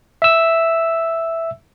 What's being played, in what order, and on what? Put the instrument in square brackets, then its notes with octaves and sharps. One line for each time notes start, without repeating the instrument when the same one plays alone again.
[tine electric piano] E5 E6